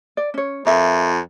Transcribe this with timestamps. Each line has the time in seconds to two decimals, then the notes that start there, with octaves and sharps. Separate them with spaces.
0.17 D5
0.34 C#4 C#5
0.66 F2 F4 A#4 E5